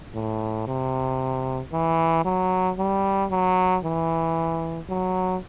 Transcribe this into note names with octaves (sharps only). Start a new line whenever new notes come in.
A2
C3
E3
F#3
G3
F#3
E3
F#3